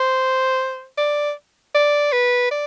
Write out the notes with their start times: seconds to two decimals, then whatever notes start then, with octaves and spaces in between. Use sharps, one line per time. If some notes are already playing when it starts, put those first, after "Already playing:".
Already playing: C5
0.98 D5
1.75 D5
2.12 B4
2.51 D5